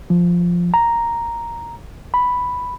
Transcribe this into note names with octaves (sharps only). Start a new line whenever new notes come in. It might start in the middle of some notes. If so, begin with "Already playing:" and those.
F3
A#5
B5